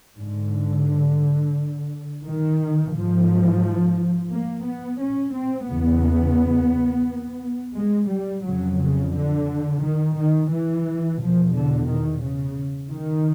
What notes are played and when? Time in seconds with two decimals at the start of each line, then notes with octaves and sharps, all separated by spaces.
0.18 G#2 D3
2.25 D#3
2.93 G#2 F3
4.31 A#3
4.66 B3
5.00 C#4
5.34 C4
5.69 E2 C#3 B3
7.75 G#3
8.10 G3
8.44 F2 C#3 F#3
8.78 C#3
9.13 D3
9.82 D#3
10.16 D#3
10.50 E3
11.19 E2 B2 F3
11.53 D3
11.88 D#3
12.23 C#3
12.92 D#3